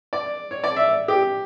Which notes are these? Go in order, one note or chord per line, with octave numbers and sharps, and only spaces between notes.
D5
C#5
D5
E5
G4